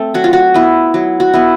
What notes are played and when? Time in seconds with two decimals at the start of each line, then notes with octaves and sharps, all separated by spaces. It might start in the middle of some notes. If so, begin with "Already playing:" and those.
Already playing: A3 C4
0.14 F#3 F#4
0.24 F4
0.33 F#4
0.54 B3 E4
0.94 F#3
1.20 F#4
1.34 B3 E4